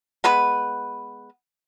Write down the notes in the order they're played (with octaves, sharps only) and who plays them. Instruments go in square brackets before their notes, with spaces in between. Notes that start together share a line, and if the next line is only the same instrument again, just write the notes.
[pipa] G#3 B3 B4 B5